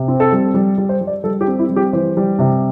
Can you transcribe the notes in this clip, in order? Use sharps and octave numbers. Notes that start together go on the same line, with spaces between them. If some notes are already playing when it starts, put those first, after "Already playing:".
Already playing: C3
C4
A4
G3
G3
G3
C5
G3
D5
G3 A4
G4
C4
E4
G3
G4
E3 C5
G3
C3